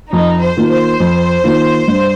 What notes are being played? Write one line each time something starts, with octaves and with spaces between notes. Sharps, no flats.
F2 D#4
C5
D#3 A#3 F4
C5
F2
D#3 A#3 F4
G2